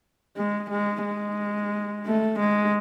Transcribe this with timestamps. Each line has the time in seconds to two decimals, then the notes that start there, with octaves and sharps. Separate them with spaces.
0.37 G#3
0.71 G#3
1.05 G#3
2.05 A3
2.39 G#3